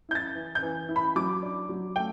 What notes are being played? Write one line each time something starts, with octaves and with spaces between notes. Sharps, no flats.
E4 G6
A6
E3
G6
E3
E4
B5
F#3 D6
D4
F#3
A3 G5